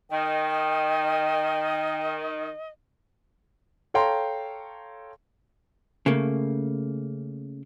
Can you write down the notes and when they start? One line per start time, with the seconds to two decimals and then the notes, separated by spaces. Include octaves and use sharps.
0.11 D#3 D#5 G5
3.94 A4 C#5 F5 G5 A#5 C6
6.06 C#3 A3 A#3